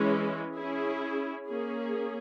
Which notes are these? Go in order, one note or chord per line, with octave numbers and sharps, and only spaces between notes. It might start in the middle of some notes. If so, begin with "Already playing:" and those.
Already playing: E3 G#3 C#4
C#4 E4 G#4
A#3 C#4 G#4